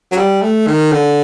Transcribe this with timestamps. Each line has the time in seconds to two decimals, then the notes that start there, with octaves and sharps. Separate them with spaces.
0.12 F#3
0.17 G3
0.42 A3
0.67 D#3
0.92 D3